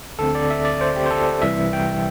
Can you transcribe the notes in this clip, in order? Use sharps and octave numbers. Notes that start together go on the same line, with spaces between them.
D2 D3 C4 A4
D5
E5
D5
C5
G4
C5
A4
C2 C3 E3 G3 E5
G5